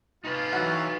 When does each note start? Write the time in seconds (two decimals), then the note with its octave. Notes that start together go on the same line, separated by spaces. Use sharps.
0.24 D#4 F4 B4
0.53 E3 F#3 E4 F#4